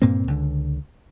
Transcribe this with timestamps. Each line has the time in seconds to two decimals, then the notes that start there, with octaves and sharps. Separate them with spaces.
0.02 G2 A#2 A#3 C4
0.28 C#2 D3